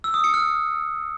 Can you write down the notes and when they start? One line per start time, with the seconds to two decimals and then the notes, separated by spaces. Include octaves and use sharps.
0.04 E6
0.14 D#6
0.24 C#7
0.34 F6